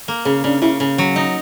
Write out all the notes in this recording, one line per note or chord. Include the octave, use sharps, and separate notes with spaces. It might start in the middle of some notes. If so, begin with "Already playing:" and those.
A#3
C#3 G#4
C#3 D4
C#3 E4
C#3
F#3
D#4